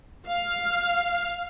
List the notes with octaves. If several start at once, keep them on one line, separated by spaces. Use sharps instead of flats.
F5